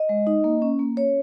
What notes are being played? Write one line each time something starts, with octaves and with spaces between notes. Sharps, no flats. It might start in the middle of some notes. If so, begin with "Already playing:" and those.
Already playing: D#5
G#3
D#4
A#3
C#4
A#3
C#4 C#5